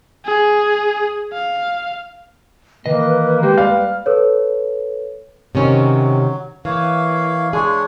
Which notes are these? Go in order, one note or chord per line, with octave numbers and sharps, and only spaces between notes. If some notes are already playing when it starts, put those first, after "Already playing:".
G#4
F5
D#3 E3 A#3 B4 D#5
G#3 A#3 G4
G3 F5
A4 B4 C#5
C3 D#3 F#3 C#4
E3 A#3 C#5 F5
G#3 D4 G#4 C#5